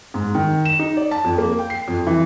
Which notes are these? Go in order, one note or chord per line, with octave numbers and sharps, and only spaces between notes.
G#2
D#3
E7
D#4
D5
A5
F2
A#3
G5
C7
F2
E3